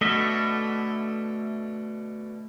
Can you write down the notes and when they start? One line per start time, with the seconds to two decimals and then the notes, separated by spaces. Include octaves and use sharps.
0.01 B2 D3 A3 D#5 E5